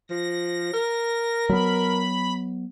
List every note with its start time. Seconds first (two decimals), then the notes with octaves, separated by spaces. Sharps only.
0.10 F3 A#6
0.74 A#4
1.49 F#3 B3 B5